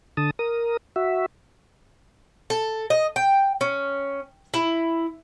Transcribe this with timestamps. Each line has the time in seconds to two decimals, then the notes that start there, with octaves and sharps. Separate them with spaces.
0.17 D3 A5 D#6
0.39 A#4 D#6
0.96 F#4 E5
2.50 A4
2.90 D#5
3.16 G5
3.61 C#4
4.54 E4